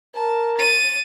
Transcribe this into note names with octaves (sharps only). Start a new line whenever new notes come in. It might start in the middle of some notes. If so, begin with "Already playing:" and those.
A#4 A5
A6 D#7